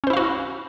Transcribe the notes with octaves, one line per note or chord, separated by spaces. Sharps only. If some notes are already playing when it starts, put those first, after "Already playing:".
C#4 E4 F#4 C5 F5